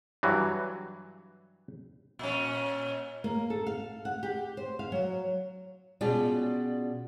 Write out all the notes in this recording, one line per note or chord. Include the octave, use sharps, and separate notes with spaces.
G2 E3 F#3
A#2 C#4
A#3
A4
F5
F#5
G4
C5
F5
F#3
B2 C#4 F4 G#4 D5 G5